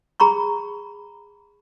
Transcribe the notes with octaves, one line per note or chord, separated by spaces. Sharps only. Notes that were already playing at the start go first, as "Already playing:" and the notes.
G#4 A#5 B5 C#6